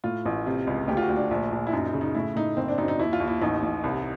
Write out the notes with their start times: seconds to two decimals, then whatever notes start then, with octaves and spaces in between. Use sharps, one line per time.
0.04 A2 F4
0.26 A1
0.46 C3
0.67 C#2
0.88 D2 G4
0.97 F4
1.03 F#4
1.09 D2
1.16 D4
1.31 A#1
1.52 A#1
1.67 E4
1.72 F#2 D#4
1.86 D#4
1.93 C#3
2.01 D#4
2.15 A2 E4
2.36 A2 D#4
2.57 F#1 C4
2.68 D4
2.78 F#2 D#4
2.88 D#4
2.99 D#2 E4
3.13 F4
3.20 D#2
3.28 E4
3.41 A1 D#4
3.63 A1
3.84 C2